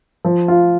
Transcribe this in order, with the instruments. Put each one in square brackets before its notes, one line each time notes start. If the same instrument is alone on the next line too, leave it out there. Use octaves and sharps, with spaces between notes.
[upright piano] F3
F4